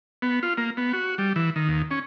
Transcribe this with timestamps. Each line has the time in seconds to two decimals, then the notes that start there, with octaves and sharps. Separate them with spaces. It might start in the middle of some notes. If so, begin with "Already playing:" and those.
0.22 B3
0.43 F4
0.57 A#3
0.77 B3
0.93 F#4
1.18 G3
1.36 E3
1.56 D#3
1.68 D#2
1.91 C#4